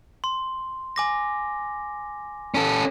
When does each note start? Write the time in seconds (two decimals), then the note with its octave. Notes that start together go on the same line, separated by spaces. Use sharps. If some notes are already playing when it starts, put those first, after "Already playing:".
0.24 C6
0.96 G#5 D6 A#6
2.54 C#4 A4